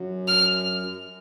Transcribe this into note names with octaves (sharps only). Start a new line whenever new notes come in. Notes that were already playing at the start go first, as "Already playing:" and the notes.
Already playing: F#2
F6